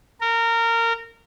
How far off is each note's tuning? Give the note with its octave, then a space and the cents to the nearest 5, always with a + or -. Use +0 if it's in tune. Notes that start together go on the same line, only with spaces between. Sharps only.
A#4 -20